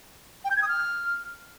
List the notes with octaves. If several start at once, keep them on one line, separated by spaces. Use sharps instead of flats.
G5
G6
G#6
D#6
F6